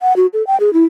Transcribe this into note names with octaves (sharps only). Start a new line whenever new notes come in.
F#5
F#4
A4
G5
G#4
E4